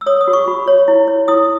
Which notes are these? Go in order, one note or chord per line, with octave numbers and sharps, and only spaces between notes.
E6
C#5 D#6
D#6
F#4
C#6
F#4 B5
C#5
E4
C#5
E4 D#6